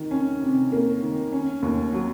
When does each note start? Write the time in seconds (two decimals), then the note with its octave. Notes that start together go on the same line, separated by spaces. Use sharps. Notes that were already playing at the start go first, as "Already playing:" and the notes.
Already playing: D#3
0.11 C#4
0.42 C3
0.72 A#3
1.02 D#3
1.32 C#4
1.62 D#2
1.93 F#3